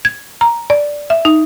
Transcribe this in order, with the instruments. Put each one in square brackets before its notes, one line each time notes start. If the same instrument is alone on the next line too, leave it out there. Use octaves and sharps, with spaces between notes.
[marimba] G#6
A#5
D5
E5
D#4